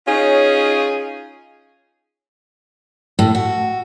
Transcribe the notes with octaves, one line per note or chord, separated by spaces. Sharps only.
C#4 D#4 F4 G#4 C#5
A2
F#4